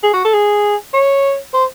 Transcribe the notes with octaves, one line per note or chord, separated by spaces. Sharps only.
G#4
F#4
A4
G#4
C#5
C5